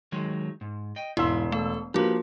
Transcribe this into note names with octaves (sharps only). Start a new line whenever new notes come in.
D#3 F#3 G#3
G#2
D#5 G5
E1 G#2 E4 E5 F5 C6 E6
A3 A4
F3 A#3 D4 F#4 G4 B4